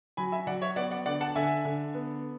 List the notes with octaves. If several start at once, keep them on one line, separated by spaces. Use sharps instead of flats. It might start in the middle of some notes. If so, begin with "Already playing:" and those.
F#3 G#5 B5
E5 G#5
F#3 D5 F#5
C#5 E5
B3 D5 F#5
D5 F#5
D3 D5 F#5
F#5 A5
D3 E5 G#5
D3
B3